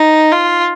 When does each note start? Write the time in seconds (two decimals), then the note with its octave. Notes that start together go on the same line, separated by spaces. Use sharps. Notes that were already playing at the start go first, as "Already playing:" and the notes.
Already playing: D#4
0.32 F4